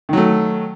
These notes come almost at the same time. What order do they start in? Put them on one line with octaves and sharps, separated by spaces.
D#3 F#3 A3